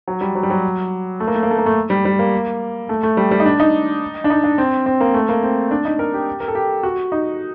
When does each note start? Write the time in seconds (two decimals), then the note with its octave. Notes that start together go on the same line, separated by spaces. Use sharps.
0.08 F#3
0.21 G3
0.35 F#3
0.43 G3
0.50 F#3
1.20 A3
1.27 A#3
1.35 A3
1.43 A#3
1.51 A3
1.58 A#3
1.66 A3
1.90 G3
2.05 G3
2.19 A#3
2.89 A3
3.03 A3
3.17 G3
3.31 G3
3.40 D#4
3.46 D4
3.60 D#4
4.24 D4
4.30 D#4
4.44 D4
4.58 C4
4.86 C4
5.01 A#3
5.14 A3
5.29 A#3
5.43 C4
5.71 D4
5.85 D#4
5.99 A#4
6.14 G4
6.40 A#4
6.48 A4
6.55 G4
6.83 F#4
7.12 D#4